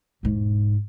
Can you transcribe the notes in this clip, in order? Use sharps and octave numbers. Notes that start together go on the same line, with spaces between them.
E1 G#2